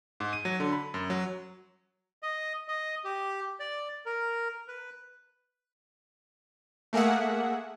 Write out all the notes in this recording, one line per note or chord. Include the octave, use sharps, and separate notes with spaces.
G#2
D#7
F#3
D3
B5
F#2
F#3
D#5
D#5
G4
D5
A#4
B4
A3 A#3 G#4 E5 F#5